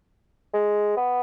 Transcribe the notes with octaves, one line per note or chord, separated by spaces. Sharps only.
G#3
B3